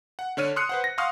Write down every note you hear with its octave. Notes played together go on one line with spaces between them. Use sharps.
F#5
D3 D4 C#5 F6 D#7
C6 D#6 F6 F#6 C#7
B4 C5 F#5
A#6
F5 F#5 C6 C#6 D#6 F6